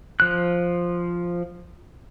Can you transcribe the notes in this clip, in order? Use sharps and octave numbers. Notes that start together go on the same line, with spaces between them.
F3 F#6